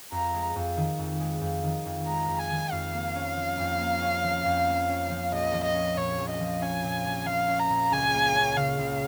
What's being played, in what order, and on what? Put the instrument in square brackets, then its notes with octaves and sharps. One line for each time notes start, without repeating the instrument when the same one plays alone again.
[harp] F2 [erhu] A#5
[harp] G#3
F2
D#3
F2
G#3
F2
D#3
F2
[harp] G#3 [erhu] A#5
[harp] F2
[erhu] G#5
[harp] D#3
[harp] F2 [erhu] F5
[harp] A#3
C#4
F3
F2
A#3
C#4
F3
F2
A#3
C#4
F3
[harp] A#1 [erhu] D#5
[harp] F3
[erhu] D#5
[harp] C#4
[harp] A#2 [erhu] C#5
[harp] A#1
[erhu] D#5
[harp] F3
[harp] C#4 [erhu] G#5
[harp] A#2
A#1
[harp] F3 [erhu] F5
[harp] C#4
[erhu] A#5
[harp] A#2
[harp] C#2 [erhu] G#5
[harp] A#3
C#4
[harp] C#3 [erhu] F5
[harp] C#2